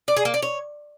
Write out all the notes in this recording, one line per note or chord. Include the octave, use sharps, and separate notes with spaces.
D5
G#4
A#3
D5
C#5